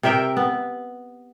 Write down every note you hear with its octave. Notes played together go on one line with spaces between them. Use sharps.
C3 A#4 E5 G5
B3